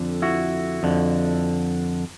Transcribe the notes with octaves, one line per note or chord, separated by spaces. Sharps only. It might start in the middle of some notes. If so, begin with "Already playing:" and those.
Already playing: F2 D3
E4 F#4
F2 D3